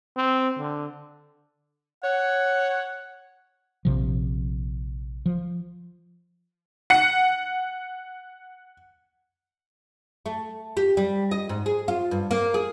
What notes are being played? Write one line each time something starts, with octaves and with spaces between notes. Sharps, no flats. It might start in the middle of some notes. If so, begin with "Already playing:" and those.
C4
D3
C#5 F#5
A#1 C3 F3
F3
F#5 C#7
A3
G4
G3
D#5
G#2
G#4
F4
G2
A#3
G#4